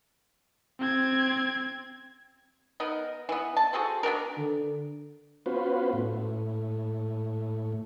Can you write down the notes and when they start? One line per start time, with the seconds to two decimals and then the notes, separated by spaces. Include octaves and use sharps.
0.80 C4 G#6
2.80 B3 D#4 A#4
3.29 E3 B3
3.56 A5
3.73 F#4 G#4 A4 C5
4.03 B3 C4 D4 A#4
4.38 D3
5.46 B3 C#4 F4 F#4 B4 C5
5.93 A2